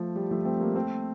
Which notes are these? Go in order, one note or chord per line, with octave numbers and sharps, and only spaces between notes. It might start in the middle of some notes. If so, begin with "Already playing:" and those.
Already playing: F3 A3
G3
F3 A3
A3 C4
G3 A#3
A3 C4